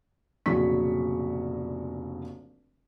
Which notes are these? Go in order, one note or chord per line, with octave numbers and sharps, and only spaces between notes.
F1 A#1 C#3 F#3 C#6 B6